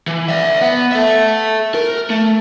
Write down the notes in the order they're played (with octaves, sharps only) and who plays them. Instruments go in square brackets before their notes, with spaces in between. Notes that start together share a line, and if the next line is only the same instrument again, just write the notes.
[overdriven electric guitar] E3
D5 E5
B3
A4 E5
A#4
A3